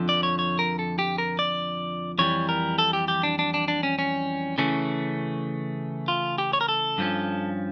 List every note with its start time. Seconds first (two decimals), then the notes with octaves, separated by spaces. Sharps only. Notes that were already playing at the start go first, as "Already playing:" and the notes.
Already playing: F2 D3 F3
0.09 D5
0.23 C#5
0.39 C#5
0.59 A#4
0.79 A4
0.99 G4
1.18 A#4
1.39 D5
2.18 F2 E3 G3 C#5
2.49 A#4
2.78 A4
2.93 G4
3.08 G4
3.23 D4
3.39 D4
3.54 D4
3.68 D4
3.83 C#4
3.99 C#4
4.58 C#3 E3 A3 C#4
6.08 F4
6.38 G4
6.53 C#5
6.61 A#4
6.69 A4
6.98 G2 F3 C#4